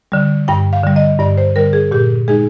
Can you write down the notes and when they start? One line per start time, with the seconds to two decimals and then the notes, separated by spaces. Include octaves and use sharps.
0.12 D3 G3
0.48 G2 G5
0.73 F5
0.83 D3 G3
0.96 D#5
1.19 G2 D5
1.38 C5
1.56 D3 G3 A#4
1.73 G#4
1.91 A#2 G4
2.28 G#3 D#4 G#4